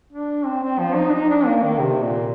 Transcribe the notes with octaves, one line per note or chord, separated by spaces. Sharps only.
D4
C4
C4
F3
D#4
D4
D#4
D4
A#3
D#3
C3
A#2